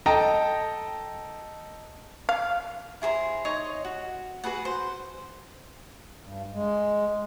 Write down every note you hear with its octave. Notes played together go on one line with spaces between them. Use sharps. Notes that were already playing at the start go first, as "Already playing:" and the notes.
A4 D#5 G5 A5 A#5
F5
E4 G#4 C5 A#5
D#4 C#5 D#5 C6
F#4
F#4 G#4 B4 F#5
C5
G2
G#3